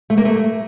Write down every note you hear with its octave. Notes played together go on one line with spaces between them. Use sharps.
A3
A#3
A3